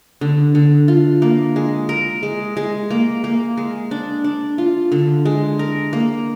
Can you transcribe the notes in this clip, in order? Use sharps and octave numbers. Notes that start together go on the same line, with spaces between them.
D3
D3
F4
A#3
G#3
A#4
G#3
G#3
A#3
A#3
G#3
D4
D4
F4
D3
G#3
A#4
A#3